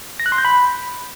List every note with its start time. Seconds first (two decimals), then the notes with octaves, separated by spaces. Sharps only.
0.20 A#6
0.26 F#6
0.32 C6
0.38 G6
0.45 B5